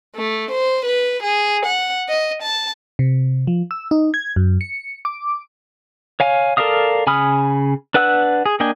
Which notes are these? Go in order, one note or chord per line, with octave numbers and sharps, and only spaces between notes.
A3
C5
B4
G#4
F#5
D#5
A5
C3
F3
E6
D#4
G#6
F#2
C#7
D6
C#5 F5 G#5
A4 A#4 D5 F5 D#6
C#3 G#5 B5 D#6 F6
D4 B4 F#5 E6 F#6
G#4
A#3 D4 D#5 G5 G#5